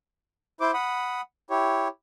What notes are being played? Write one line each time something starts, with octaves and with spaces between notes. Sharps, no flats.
E4 C5 D6
F#5 B5 D#6
E4 G4 C#5